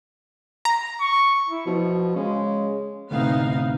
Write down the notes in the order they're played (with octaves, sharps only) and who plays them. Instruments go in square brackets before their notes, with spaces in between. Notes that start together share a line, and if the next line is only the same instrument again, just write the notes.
[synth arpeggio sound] A#5
[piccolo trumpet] C#6
[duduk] E4
[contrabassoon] B2 [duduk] F3
[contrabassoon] C#3 [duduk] G#3
[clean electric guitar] D2 A2 C3 [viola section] B3 D#4 F5